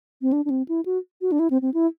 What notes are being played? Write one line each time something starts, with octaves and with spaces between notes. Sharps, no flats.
C4
D4
D4
C4
E4
F#4
F#4
D4
E4
C4
C4
E4